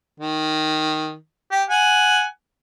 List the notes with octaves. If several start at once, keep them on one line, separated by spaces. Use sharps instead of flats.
D#3
G4
F#5 G#5